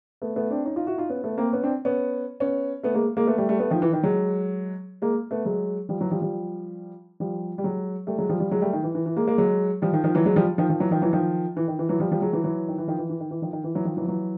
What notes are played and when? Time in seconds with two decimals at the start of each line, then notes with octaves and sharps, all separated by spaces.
0.22 A3 B3
0.36 A3 B3
0.50 C4 D4
0.65 C#4 D#4
0.76 D#4 F4
0.87 E4 F#4
0.98 D#4 F4
1.09 B3 C#4
1.24 A3 B3
1.38 A#3 C4
1.53 B3 C#4
1.63 C4 D4
1.85 B3 C#4
2.40 B3 C#4
2.83 A3 B3
2.94 G#3 A#3
3.17 G#3 A#3
3.27 A3 B3
3.38 G3 A3
3.49 G3 A3
3.59 A3 B3
3.70 D#3 F3
3.82 E3
3.93 D#3
4.03 F#3 G#3
5.02 G#3 A#3
5.31 A3 B3
5.45 F#3 G#3
5.89 F3 G3
6.00 E3 F#3
6.11 F3 G3
6.22 F3 G3
7.20 F3 G3
7.58 G3
7.63 F#3 G#3
8.07 G3 A3
8.18 F#3 G#3
8.29 F3 G3
8.40 F3 G3
8.51 F#3 G#3
8.62 G3 A3
8.73 D#3
8.83 E3
8.95 E3
9.06 E3
9.16 G#3 A#3
9.27 G#3 A#3
9.38 F#3 G#3
9.82 F3 G3
9.93 D#3 F3
10.04 D#3 F3
10.15 E3 F#3
10.25 F#3 G#3
10.36 F3 G3
10.58 D#3 F3
10.70 D#3 F3
10.80 E3 F#3
10.91 D#3 F3
11.02 E3 F#3
11.13 D#3 F3
11.57 E3
11.68 D#3
11.79 E3
11.89 E3 F#3
12.00 F3 G3
12.12 F3 G3
12.22 F#3 G#3
12.33 E3 F#3
12.44 E3 F#3
12.68 D#3
12.78 E3
12.88 D#3 F3
12.98 E3
13.09 E3
13.20 D#3
13.31 E3
13.42 D#3 F3
13.53 D#3
13.64 E3
13.75 E3 F#3
13.85 D#3 F3
13.97 E3 F#3
14.02 F3
14.07 E3 F#3